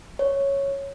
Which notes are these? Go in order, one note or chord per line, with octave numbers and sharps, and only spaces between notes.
C#5